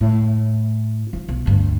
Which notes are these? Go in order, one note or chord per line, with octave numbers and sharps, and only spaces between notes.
A2
F3 D#4
B1
D2 G2